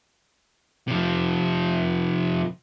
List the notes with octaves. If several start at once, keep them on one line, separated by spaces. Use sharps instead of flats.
C3 F3